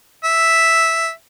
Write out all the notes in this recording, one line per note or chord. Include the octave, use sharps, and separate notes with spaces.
E5